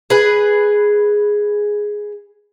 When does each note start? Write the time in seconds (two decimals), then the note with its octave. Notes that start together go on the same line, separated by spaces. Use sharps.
0.10 G#4 B4